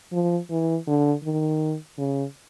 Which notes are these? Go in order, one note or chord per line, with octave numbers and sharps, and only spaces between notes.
F3
E3
D3
D#3
C#3